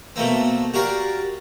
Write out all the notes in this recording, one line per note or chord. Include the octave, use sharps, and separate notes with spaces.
B2 A3 A#3 C4
F#4 G4 A#4 D5 F5